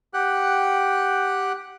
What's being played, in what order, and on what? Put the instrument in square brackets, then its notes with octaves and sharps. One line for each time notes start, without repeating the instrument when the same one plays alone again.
[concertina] G4 F#5 G5 F#6